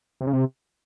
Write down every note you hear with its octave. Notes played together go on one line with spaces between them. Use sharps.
C3
C#3
C3